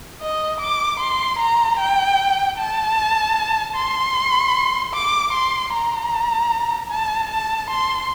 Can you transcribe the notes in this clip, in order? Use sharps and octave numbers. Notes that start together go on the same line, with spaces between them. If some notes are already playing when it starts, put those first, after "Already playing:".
D#5
D6
C6
A#5
G5
A5
C6
D6
C6
A#5
A5
A5
C6